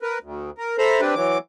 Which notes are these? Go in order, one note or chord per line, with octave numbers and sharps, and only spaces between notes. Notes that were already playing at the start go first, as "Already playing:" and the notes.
A#4 B4
D2
A#4
A4 C5 E5 A#5 B5
C4 D4 G4 B4
E3 F#3 D6